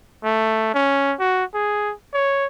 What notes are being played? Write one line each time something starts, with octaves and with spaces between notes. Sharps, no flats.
A3
C#4
F#4
G#4
C#5